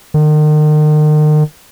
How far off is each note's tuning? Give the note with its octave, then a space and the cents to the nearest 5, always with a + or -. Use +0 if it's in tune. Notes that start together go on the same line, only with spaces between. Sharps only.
D#3 -40